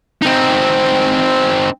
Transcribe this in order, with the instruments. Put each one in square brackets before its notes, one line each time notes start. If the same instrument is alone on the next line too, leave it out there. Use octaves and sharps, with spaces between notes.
[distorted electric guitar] C4 D#4